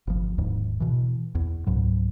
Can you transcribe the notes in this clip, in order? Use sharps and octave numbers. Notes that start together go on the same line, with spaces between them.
G1 D2 F3
D1 D#2 G#2
B2 E3
E2
C#2 G#2 F#3